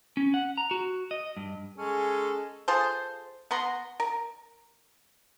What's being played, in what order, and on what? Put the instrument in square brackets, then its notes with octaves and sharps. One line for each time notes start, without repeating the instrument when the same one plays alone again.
[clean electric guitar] C#4
F#5
A#5
F#4
D#5
G2
[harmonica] G#3 C#4 A4
[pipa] F4 G#4 A4 C5
B3 F#5 A#5 C6
A#4